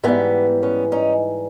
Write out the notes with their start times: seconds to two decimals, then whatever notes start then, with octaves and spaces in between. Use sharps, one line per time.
0.03 G#2 E3 G3 A3 B3
0.63 B3 C#4
0.92 C#4 D#4